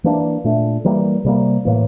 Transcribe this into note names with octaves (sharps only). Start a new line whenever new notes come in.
E3 A#3 D4
A#2 A3 D4
E3 G3 A#3
C3 G3 A#3
A2 E3 A#3